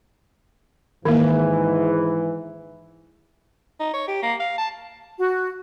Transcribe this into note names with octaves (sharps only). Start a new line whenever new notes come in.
G#2 D#3 E3 A#3
D#4
C#5
G4
A#3
F5
A5
F#4